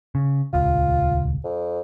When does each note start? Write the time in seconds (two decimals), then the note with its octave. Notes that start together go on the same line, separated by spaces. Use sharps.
0.15 C#3
0.53 D#1 C#2 F4
1.44 F2